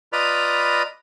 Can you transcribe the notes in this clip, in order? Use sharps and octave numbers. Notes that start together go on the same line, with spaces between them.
F4 B4 D5 D#5 A#5 B5